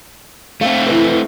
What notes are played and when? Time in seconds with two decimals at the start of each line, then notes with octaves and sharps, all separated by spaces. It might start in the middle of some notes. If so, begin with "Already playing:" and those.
0.61 A3 C4 F5
0.86 E3 B4